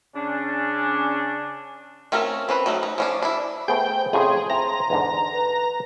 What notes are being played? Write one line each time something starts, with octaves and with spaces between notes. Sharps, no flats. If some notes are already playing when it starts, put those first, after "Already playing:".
C#3 C#4 D4
A3 C4 C#4 F4 A#4
C4 C#4 B4
F#3 A3 D#4
D#4
F3 C#4 D4
D4 E4
A3 B3 G#4 C5 G5
F2 A2 C#3 G#4 C6
C4 E4 A5 A#5
E2 G#2 D3
B4